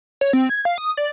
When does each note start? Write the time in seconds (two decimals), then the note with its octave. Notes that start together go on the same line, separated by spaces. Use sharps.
0.21 C#5
0.33 C4
0.49 G#6
0.65 F5
0.78 D#6
0.97 D5